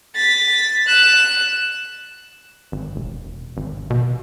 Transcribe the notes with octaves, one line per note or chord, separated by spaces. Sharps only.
A6 B6
F#6 E7
G#1
E1
G#1
B2